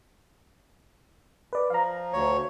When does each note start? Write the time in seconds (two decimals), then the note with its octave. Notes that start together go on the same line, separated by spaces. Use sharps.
1.53 B4 D5
1.70 F3 F5 A#5
2.13 D2 C#5